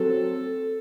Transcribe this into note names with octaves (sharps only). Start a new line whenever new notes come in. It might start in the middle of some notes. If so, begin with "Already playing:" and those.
Already playing: F#3 C4 A4